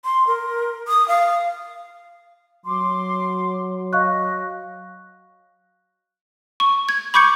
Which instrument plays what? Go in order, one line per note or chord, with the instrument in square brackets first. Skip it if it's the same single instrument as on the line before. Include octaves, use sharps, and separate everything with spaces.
[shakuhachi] C6
A#4
D#6
F5
[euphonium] F#3 [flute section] C6 D6
[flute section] D#5 [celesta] F5 C#6 F#6
[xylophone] C#6
G#6
B5 C#6 D6 G6 G#6 C#7